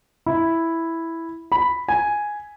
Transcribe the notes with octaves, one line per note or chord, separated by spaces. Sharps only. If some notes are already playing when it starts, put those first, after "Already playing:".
E4
B5
G#5